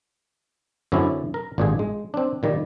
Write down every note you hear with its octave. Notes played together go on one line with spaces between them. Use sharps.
F#2 D3 C4 C#4 E4 D5
A#4
G#1 A#2 D4 F4 G4 G#4
G#3
C4 D4
A#2 D#3 G3 D5